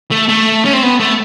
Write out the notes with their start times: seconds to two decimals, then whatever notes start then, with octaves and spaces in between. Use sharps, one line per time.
0.11 A3
0.29 A3
0.65 C#4
0.73 C4
0.83 B3
1.00 A3